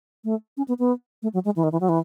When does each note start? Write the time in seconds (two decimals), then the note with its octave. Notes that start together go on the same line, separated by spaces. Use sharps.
0.24 A3
0.57 C#4
0.68 B3
0.79 B3
1.22 A3
1.34 F#3
1.45 G#3
1.56 E3
1.63 D#3
1.72 E3
1.81 F#3
1.89 E3